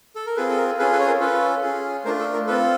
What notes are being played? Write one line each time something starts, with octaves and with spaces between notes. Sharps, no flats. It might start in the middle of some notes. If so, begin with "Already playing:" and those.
A4
A#4
C4 F4 G#4 A4 B4
A4
A#4
C#4 F4 G#4 A4 B4
A4 B4
C#5
A#4 C5
C#4 F4 A4 B4
C#4 F4 G#4
A3 D4 F4 A#4 C5
A4
A#4
C4 F4 A4 B4